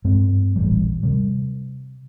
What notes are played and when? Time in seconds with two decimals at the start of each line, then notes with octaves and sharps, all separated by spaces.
0.05 G2 G#3 C4
0.56 D#1 A1 G3
1.03 C3 G3